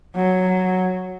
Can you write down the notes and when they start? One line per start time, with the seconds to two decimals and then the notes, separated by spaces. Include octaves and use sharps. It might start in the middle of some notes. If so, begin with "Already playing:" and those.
0.16 F#3